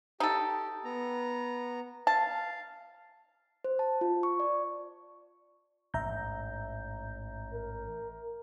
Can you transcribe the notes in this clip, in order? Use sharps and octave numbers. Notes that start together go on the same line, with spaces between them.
D#4 G4 A4
B3 A#5
F5 A5
C5
A5
F4
C#6
D5
A1 G#2 E5 A#5 G6
A#4